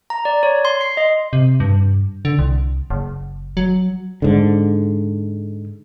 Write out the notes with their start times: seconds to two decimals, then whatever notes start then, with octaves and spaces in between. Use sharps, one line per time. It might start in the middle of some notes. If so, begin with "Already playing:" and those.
0.10 A#5
0.25 D5
0.43 C#5
0.65 C6
0.81 C7
0.97 D#5
1.33 C3
1.60 G2
2.25 D3
2.39 C2
2.90 F#1
3.57 F#3
4.22 G#2 D3